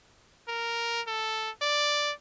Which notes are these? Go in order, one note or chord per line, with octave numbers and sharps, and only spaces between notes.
A#4
A4
D5